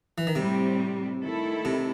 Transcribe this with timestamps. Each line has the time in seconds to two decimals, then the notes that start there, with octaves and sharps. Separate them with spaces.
0.18 E3
0.27 D#3
0.35 A2 C3 G3 C4
1.22 D#3 A3 E4 A4
1.65 C3